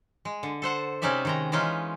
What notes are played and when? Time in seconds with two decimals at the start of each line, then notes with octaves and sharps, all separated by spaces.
0.25 G#3
0.43 D3
0.62 A4 C5 F#5
1.02 C3 G#3 C#4 D#4 D5 E5
1.25 D#3 G#3 A#5
1.52 E3 G#3 C#4 D#4 F4